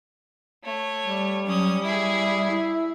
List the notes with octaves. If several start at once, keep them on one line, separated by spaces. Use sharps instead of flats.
A3 C#5
G3
F#3 C#4 D#6
E4 G#4 E5
E4